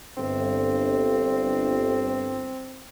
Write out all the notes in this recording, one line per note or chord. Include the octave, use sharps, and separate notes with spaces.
G1 C4